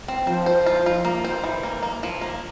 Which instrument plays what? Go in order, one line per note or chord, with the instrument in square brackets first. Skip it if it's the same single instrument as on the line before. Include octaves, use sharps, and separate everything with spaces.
[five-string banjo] C4
[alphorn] F3 [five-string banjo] C5
[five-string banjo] C5
F4
F4
A#3
C5
E3
A#3
A#3
F3
A#3